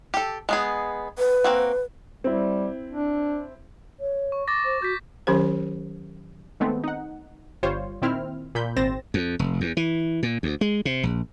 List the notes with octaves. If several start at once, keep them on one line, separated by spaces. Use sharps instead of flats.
G4 A4
G#3 B3 G#4
B4
A#3 C4 F#4
G3 C4 E4
D4
C#5
C#6
D6 A6 A#6
C5
F#4 G6 B6
D#3 F#3 C#4 G4 C5
D#3 G#3 A3 B3 C4
D#4 F#5
G1 G3 F4 C5 C#5
A#2 D#3 C4 E4 F6
A#2 B5 G6
G#1 C4 C5 A6 A#6 E7
F2
F1
E2
E3
A#2
D2
G#3
C3
A#1